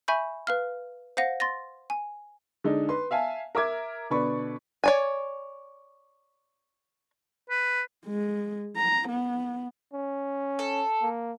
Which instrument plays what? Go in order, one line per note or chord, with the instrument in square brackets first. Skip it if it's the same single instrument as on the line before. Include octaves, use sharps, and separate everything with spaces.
[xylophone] E5 G#5 B5 C#6 G6
B4 F5 F6
C5 F5 F#5 A#6
C6 A6 A#6
G#5
[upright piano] D3 G#3 D4 D#4
B4 C6
E5 F5 G#5 A5
A#4 E5 D6 G#6
B2 D3 B4 D5 B5 C#6
[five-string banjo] C#5 D5 G#5
[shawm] B4
[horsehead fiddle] G#3
A#5
B3
[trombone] C#4
[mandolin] A4
[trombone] A#3